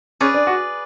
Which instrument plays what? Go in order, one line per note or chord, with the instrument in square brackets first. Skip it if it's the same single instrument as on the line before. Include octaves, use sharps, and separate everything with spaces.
[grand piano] C#4 [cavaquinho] G#4 B4 D5
[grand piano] D4
F#4